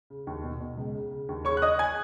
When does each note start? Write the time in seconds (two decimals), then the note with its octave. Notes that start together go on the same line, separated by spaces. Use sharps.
0.10 C#3
0.27 D#2
0.44 B2
0.60 B2
0.77 C#2
0.94 C#3
1.11 C#3
1.29 D#2
1.45 C#3 C#5 C#6
1.57 F#6
1.62 C#3 D#5 D#6
1.79 G#5 G#6